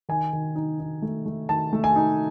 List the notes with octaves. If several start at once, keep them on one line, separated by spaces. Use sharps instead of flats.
D#3 G#5
D#3
D#4
D#4
A3
A3
D#3 A5
A3
G#5
D#4